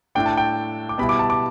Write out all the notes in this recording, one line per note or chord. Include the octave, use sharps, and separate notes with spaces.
A2 A3 D4 G5
A5
G5
D6
B2 G3 E4 B5
D6
A5
D6